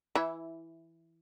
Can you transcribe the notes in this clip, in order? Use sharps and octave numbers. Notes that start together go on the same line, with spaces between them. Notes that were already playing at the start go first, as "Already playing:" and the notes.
E3 E4